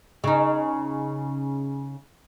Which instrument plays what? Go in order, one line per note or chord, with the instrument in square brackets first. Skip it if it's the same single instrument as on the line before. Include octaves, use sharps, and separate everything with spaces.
[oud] C#3 D#4